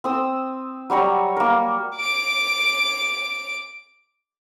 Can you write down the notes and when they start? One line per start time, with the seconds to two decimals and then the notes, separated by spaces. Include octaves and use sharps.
0.04 C4 D#6 E6
0.90 F#3 G3 C#5 A#5
1.37 A#3 A#4
1.97 D6 D7